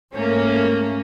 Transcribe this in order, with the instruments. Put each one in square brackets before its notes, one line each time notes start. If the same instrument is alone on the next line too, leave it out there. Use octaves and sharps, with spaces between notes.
[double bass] G#2 A3 [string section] A#3 C#4